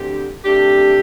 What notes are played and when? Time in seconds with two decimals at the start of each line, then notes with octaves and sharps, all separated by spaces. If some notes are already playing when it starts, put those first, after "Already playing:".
Already playing: D2 D3 C4 G4
0.44 C3 A3 D4 G4